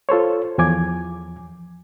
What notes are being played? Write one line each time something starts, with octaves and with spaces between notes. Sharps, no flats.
F4 A4 C5 C#5
E2 F3 G#5 D6 G#6